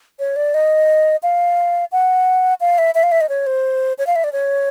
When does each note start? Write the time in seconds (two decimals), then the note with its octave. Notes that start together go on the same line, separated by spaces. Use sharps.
0.19 C#5
0.36 D5
0.54 D#5
1.23 F5
1.92 F#5
2.61 F5
2.78 E5
2.95 E5
3.03 F5
3.12 E5
3.21 D#5
3.29 C#5
3.47 C5
3.98 C#5
4.07 F5
4.16 E5
4.24 D5
4.33 C#5